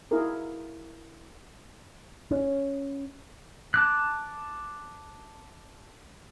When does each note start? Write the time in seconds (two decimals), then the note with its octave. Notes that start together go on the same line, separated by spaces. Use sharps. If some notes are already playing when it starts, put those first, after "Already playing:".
0.11 E4 F#4 G#4 A#4
2.31 C#4
3.74 A5 D6 F#6